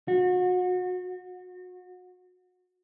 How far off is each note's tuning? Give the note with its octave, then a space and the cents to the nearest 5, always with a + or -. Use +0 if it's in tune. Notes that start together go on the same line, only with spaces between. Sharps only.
F#4 -30